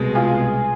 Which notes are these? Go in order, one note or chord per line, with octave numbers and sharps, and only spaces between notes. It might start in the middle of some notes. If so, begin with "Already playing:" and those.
Already playing: C2 B2 G#3
F4 G#4